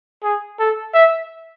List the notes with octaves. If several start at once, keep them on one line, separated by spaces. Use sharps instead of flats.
G#4
A4
E5